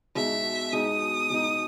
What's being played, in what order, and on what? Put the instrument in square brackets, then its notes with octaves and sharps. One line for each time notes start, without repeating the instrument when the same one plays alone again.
[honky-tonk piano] B2 G#3 D#4 [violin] E5
[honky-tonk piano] B2 G#3 D#4 [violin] D#6
[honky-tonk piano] B2 G#3 D#4